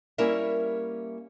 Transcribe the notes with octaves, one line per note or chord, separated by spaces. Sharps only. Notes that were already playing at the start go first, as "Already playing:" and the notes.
G3 A#3 C#4 E4 A#4 E5